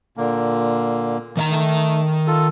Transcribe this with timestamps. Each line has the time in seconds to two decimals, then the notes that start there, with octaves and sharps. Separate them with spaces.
0.17 A#2 D3 A#3
1.37 D#3 D#5 A#5
1.50 A3
2.27 F4 A4